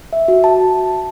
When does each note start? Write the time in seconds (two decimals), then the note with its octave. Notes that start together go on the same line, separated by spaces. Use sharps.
0.13 E5
0.28 F#4
0.44 A5